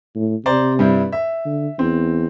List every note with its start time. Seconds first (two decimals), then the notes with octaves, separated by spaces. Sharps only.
0.16 A2
0.46 C3 C5 D5 A#5
0.79 G2 G3 E4
1.12 E5
1.45 D3
1.79 E2 C4